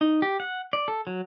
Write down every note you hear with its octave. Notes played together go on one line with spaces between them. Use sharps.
D#4
G4
F#5
D5
A4
F#3